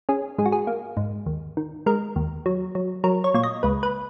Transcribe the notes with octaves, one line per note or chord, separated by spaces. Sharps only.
C#4 G#4
G#2 G#4
F#4
G#4
A#3
G#2
D#2
D#3
G#3 A#4
D#2
F#3
F#3
F#3 A#4
C#5
A#2 C#5
D#5
C#2 B4
B4